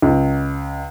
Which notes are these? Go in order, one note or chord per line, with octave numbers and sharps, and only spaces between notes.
C#2